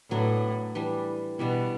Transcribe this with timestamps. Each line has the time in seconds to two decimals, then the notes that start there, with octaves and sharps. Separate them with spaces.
0.11 A2 F#3 B3 D4
0.75 E3 G3 D4
1.39 B2 E3 G3 D4